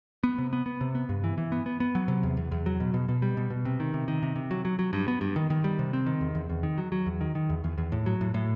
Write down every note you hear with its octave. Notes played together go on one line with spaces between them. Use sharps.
B3
C3
B3
B3
C3
B3
G2
E3
E3
B3
B3
B3
F#3
C3
E2
E2
E2
F#3
B2
B2
B2
G3
B2
B2
C3
D#3
C3
D#3
C3
C3
F#3
F#3
F#3
G2
B3
G2
D#3
D#3
G3
C3
C4
D#3
E2
E2
E2
D#3
F#3
F#3
E2
D#3
D#3
E2
E2
E2
A2
F#3
A2
A2